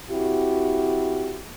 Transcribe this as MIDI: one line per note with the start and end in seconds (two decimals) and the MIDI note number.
0.10 1.43 60
0.10 1.43 64
0.10 1.43 66
0.10 1.43 67